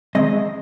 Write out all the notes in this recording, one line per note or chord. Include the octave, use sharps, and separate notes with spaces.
D#3 G#3 C4 D#5